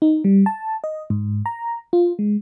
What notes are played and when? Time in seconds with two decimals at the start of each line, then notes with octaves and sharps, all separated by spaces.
0.02 D#4
0.24 G3
0.46 A5
0.84 D#5
1.10 G#2
1.46 A#5
1.93 F4
2.19 G#3